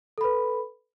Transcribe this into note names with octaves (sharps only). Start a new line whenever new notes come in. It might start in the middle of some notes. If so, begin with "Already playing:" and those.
A4 B4 B5